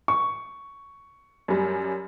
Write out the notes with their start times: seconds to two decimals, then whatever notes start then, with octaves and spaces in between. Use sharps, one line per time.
0.08 C#6
1.48 F#2 G3